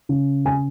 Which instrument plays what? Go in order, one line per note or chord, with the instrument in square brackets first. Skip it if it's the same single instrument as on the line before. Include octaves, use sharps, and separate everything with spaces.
[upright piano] C#3
G#5